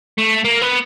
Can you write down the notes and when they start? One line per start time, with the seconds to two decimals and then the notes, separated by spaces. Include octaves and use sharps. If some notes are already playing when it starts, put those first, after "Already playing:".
0.18 A3
0.44 A#3
0.61 B3